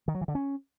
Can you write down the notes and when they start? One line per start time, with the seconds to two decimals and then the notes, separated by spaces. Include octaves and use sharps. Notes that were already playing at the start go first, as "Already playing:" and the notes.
0.08 D#3
0.15 F#3
0.21 E3
0.28 D3
0.35 C#4